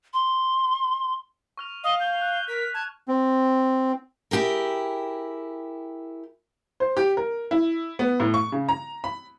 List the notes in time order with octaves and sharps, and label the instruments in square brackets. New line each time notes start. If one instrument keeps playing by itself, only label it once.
[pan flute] C6
[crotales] C#6 F6 F7
[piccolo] D#5 [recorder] F5
[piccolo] G6
[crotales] F#6
[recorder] A#4 [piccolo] B6
[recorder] A5 [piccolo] G#6
[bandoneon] C4
[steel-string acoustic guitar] E4 G4 G#4 A#4
[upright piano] C5
G4
A#4
E4
B3
A2
C#6
C#3
A#5
B5